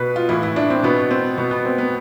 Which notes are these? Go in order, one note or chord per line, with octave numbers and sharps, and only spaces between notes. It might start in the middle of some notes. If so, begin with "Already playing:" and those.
Already playing: B2 B4
F4
A2 E3 E4
E4
D4
C4
B2 B3
C4
B2 B3
B3
C4
B3